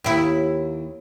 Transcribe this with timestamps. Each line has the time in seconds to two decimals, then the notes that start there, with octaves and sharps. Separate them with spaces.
0.04 D#2 E4